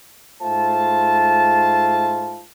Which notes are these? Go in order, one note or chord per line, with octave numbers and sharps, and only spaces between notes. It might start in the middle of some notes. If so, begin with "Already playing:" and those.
G#2 A3 F4 C5 A5